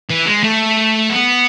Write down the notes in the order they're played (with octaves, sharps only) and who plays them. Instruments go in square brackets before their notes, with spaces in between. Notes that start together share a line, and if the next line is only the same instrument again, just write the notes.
[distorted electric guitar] E3
G#3
A3
B3